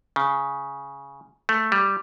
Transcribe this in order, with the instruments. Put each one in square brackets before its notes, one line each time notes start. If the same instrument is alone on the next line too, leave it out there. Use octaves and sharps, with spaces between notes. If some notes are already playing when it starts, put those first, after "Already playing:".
[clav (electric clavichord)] C#3
A3
G3